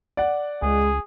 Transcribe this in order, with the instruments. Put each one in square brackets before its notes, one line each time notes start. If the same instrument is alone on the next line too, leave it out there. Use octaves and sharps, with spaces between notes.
[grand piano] D5 F#5
[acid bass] C#2 [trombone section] G#3 [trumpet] G#4